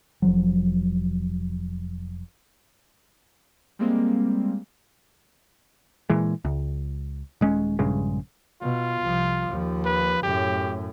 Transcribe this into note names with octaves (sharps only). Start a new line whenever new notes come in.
F1 F3 F#3
G3 G#3 A#3 C4
A#2 E3 G#3
C#2
D#1 G#3 C#4
A#1 G2 C#3 G#3
B2 F4
C2 F3
D#2 F3
B4
F#2 A2 G4